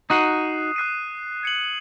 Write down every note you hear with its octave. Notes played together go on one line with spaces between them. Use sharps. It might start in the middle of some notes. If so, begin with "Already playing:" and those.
D#4 F#4 D#6 F#6 C7 D#7
D#6 F#6 C7 D#7
G#6 C#7 F#7